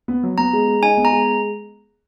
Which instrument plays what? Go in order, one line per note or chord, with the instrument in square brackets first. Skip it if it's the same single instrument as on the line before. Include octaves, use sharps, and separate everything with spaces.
[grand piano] B3
F#3
[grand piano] B3 [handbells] A#5
[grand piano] G#3
G#3
[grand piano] D#4 [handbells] G#5
[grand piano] B3
[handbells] A#5
[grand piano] G#3